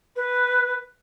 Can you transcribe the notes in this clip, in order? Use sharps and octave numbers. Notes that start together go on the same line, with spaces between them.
B4